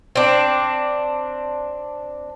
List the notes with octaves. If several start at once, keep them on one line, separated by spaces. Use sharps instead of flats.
C4 D4